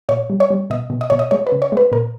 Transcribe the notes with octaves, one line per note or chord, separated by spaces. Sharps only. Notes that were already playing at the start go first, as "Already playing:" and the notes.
A#2 C#5
G3
C#5
G3
B2 D#5
B2
D#5
B2 C#5
D#5
G#3 C#5
B4
C#3
C#5
G#3 B4
A#2 A#4